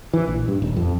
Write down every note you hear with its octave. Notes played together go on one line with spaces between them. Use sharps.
E3
A#1
G2
D#1
F2